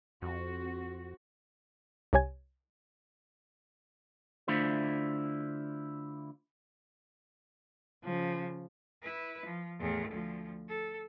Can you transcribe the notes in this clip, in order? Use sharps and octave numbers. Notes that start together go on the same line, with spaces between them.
F2 C4 F#4
C2 C3 G4 C#5 G#5 G#6
D3 A3 D4 E4 F4 C5
C#3 F3
E4 B4
F3
E2 A2
D2 F3
A4